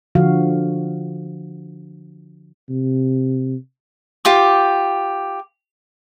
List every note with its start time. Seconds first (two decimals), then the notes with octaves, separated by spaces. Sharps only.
0.15 D3 F3 F#4 F5
2.70 C3
4.25 F4 G4 D6